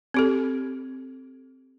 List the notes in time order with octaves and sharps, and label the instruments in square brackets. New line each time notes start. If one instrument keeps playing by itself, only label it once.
[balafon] C4 G4 A4